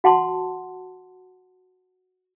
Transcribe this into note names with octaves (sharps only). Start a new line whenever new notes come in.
F#4 F#5 A5 C6